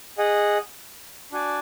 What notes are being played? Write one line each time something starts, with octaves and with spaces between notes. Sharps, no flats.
G#4 D#5 F#5
D4 F#4 D5 G#5